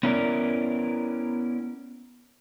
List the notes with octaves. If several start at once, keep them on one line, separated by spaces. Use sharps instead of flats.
B3 C#4 E4 A#4 D5